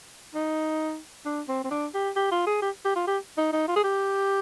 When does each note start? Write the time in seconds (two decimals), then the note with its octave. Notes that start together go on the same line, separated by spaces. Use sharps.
0.34 D#4
1.25 D4
1.48 C4
1.64 C4
1.71 D4
1.94 G4
2.16 G4
2.32 F4
2.47 G#4
2.62 G4
2.85 G4
2.96 F4
3.07 G4
3.38 D#4
3.53 D#4
3.68 F4
3.76 G#4
3.83 G4